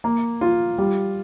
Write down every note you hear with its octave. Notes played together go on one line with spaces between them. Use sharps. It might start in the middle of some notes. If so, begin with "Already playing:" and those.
A#3
F4
G3